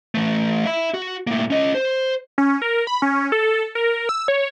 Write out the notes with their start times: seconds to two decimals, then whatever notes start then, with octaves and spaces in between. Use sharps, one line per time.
0.15 E3 A3
0.66 E5 B5
0.94 F#4
1.27 A2 A#3
1.50 C#4 D#5
1.74 C5
2.38 C#4
2.62 A#4
2.87 B5
3.02 C#4
3.32 A4
3.75 A#4
4.09 E6
4.28 C#5